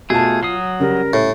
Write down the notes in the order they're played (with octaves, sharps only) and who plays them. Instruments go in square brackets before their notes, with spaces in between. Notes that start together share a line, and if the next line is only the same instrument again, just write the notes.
[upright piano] B2 A5 [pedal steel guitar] A3 G#4 [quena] F4
[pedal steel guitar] F#3 D#6 [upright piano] C7
[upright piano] C#3 G3 [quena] A#4
[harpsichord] A2